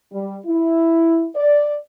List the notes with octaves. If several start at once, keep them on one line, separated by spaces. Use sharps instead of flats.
G3
E4
D5